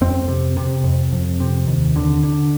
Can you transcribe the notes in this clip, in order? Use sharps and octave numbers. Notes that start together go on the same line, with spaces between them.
F2 C4
C3
C3
F2
F2
C3
D#2
D3
D3